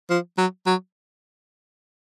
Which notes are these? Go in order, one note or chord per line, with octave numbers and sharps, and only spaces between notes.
F3
F#3
F#3